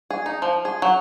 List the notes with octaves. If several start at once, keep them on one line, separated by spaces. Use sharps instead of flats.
G#4
D#4
F3
G#4
F#3